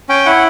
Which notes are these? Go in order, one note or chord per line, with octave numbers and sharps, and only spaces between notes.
C#4 G5
E4 F#5